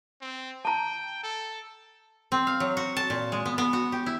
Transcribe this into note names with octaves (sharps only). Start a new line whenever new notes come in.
C4
G5 A5 A#5
A4
C4
F5
F#3
F#4
A5
A#2
G#3
B3
B3
F#4
G4
E4